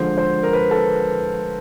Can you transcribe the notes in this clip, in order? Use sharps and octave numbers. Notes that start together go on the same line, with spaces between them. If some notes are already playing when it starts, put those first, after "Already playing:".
Already playing: D3 F3 G#3 C5
C5
A#4
B4
A4